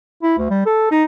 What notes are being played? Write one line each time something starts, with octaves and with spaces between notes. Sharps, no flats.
E4
D2
G3
A4
D#4